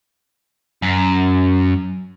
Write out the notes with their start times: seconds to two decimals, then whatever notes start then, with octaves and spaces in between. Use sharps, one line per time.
0.82 F#2